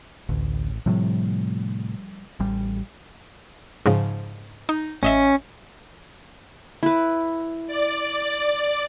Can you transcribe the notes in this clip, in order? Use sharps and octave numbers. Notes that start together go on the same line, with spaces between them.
A1 D2
A2 C3 F3 G3 A3
A1 G3
G#2 C#3 F3
D#4
A1 C#4 D#5 E5
E4 B4
D5